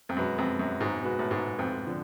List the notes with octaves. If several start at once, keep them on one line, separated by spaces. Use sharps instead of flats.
F2
F#2 B2 G#3 B3 F#4 B4
F2
F#2
G#2
B2 G#3 B3 F#4 B4
A2
G#2
F2
D3 F3